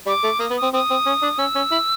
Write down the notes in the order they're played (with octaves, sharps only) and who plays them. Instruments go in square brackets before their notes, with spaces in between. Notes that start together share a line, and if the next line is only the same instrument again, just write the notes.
[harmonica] G3 [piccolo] D6
[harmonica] A3
[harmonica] A#3 [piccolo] D#6
[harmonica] B3
[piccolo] D#6
[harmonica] C4
[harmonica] C4 [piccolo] D#6
[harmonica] C4
C#4
D4
[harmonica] C#4 [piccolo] E6
[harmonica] C#4
E4